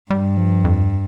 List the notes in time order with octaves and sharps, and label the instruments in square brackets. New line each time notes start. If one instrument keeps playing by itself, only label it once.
[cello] G2 [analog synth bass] G3
[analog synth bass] F3
F2